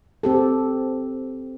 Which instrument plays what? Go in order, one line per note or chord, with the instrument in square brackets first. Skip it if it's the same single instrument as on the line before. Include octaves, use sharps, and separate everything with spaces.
[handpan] C4 G4 A4